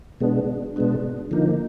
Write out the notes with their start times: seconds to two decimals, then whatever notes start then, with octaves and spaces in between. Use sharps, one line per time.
0.20 B2 G#3 B3 D4
0.76 B2 G#3 B3 D4
1.31 D3 F3 A#3 D#4